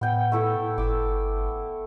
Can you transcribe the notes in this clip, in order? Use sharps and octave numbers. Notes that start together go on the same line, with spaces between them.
A2 B3 G5
A3 E4 A4
G1 D6 E6